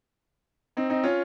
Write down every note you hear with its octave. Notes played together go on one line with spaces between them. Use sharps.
C4 D#4
C4 D#4
C#4 F4